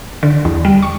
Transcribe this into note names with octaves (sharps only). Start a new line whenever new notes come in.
D3
E2
G3
C#6